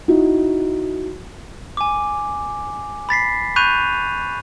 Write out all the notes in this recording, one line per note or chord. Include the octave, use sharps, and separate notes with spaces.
D#4 E4 F#4
G#5 D6
B5 A6 B6 C7
B5 C#6 F#6 G6 D#7 F7